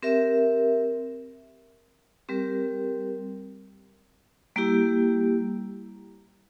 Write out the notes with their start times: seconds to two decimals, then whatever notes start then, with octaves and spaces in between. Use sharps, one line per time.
0.03 C4 G4 A#4 E5
2.29 G3 C4 G4 A#4
4.56 G3 A#3 E4 G4